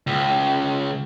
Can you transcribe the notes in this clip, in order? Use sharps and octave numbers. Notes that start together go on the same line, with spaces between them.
C#2